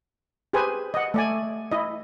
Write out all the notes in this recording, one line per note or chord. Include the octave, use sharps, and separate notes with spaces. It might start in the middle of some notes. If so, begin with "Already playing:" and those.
G4 G#4 B4 C5 G#5
D#5 F#5
A3 D5 G#5
E4 D#5